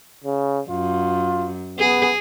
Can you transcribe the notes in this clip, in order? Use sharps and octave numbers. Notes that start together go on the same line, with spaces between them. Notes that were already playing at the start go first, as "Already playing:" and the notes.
C#3
F#2 F4
B3 G#4